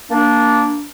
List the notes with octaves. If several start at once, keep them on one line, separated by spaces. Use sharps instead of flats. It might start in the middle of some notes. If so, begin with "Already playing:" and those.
A#3 D4